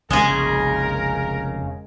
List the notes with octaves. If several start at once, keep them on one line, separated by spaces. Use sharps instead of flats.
F1 C#3 G#3 C#4 G#4 A#4